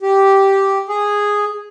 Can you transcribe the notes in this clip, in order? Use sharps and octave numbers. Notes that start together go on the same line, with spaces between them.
G4
G#4